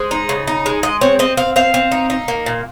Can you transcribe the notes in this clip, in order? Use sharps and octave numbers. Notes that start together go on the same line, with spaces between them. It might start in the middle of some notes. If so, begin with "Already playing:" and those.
Already playing: G#3 C5
D#4
C#3
D#4
G#3
G#3 D#5
C4 C#5
C4 D#5
C4 F5
C4 F5
C4
D#4
D#4
A#3
A#2